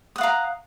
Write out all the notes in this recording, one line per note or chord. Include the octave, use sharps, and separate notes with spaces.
F5 F#5 A#5 D#6